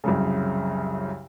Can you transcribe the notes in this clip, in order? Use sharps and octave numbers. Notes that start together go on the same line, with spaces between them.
C2 F#2 C#3